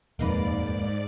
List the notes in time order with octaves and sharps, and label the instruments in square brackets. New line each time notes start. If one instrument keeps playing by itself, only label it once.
[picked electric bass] D#1 F2 [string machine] G#2 D5 [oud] A#3 D#4 B4